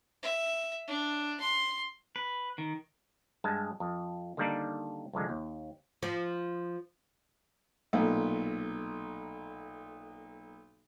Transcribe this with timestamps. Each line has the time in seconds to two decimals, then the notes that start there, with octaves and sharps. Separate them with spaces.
0.23 E5
0.88 D4
1.40 C6
2.16 B4
2.58 D#3
3.44 G2 G#3 A5
3.80 F2
4.37 D3 D#3 G3 A#3 D4 D#4
5.13 C2 F2 D3 G#3
5.29 D#2
6.03 F3
7.93 B1 A#2 A3